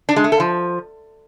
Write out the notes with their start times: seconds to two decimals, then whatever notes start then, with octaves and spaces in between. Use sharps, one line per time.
0.09 D4
0.16 G#3
0.24 A3
0.32 A4
0.40 F3